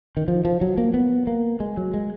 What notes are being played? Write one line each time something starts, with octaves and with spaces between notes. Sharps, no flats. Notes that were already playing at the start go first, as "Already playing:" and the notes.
D#3
F3
F3
F#3
A#3
B3
A#3
G#3
F#3
G#3